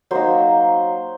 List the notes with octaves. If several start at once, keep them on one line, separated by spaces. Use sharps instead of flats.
F#3 A#3 D#4 C5